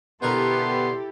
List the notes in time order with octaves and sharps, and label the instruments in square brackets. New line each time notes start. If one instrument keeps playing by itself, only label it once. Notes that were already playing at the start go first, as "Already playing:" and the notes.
[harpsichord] B2 D3 A#4 [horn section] B3 [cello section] E4 G4 A4 [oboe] C6